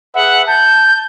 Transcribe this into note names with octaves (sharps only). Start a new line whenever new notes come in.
G#4 B4 E5 F#5
A5 G6